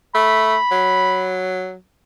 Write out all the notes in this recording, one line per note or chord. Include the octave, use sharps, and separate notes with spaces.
A3 B5
F#3